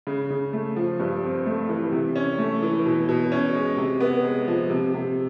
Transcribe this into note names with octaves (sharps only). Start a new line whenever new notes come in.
C#3
C#3
A3
F3
G2
C4
A3
E3
C3
C#4
A3
E3
B2
B2
C#4
G#3
C3
B3
G#3
F3
C3
C3